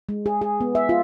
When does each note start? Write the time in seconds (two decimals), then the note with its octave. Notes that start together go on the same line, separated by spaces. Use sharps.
0.09 G#3
0.26 G#4
0.41 G#4
0.61 B3
0.75 E5
0.89 F4